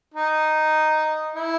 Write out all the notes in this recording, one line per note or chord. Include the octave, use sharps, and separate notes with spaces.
D#4
E4